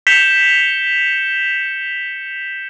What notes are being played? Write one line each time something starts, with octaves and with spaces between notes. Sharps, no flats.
G6 B6 C#7 E7 F7 G7